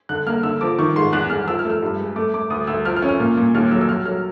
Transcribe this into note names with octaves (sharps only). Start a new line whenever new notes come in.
D3 F#6
A#3 F6
D3 E6
F3 D6
D#3 C#6
G#2 C6
E2 F#6
E2 F6
F3 E6
F6
A3
E6
G2
G#3
A3 D6
A3 D6
D2 D#6
D2 E6
F3 F6
F6
C#4
F6
A#2
A#2
D#2 F6
F#3 E6
E6
F#3 F6
F#3 F6